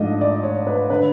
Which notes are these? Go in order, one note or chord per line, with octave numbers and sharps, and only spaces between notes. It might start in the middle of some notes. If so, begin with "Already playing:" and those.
Already playing: G#2 F3 A3 D4 D#5
D5
C#5
B4
D3 B4